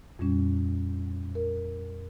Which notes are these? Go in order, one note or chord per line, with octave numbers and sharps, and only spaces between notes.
F2 A#2 G3 C#4
A#4